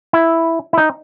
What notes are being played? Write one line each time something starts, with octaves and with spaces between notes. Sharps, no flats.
E4
E4
D#4